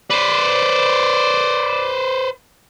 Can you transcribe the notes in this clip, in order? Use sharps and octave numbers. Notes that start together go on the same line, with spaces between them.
B4 C5 D5